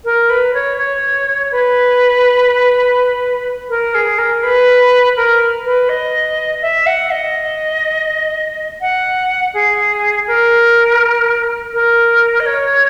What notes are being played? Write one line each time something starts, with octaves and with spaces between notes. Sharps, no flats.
A#4
B4
C#5
C#5
B4
A#4
G#4
A#4
B4
A#4
B4
D#5
E5
F#5
D#5
F#5
G#4
A#4
A#4
D#5
C#5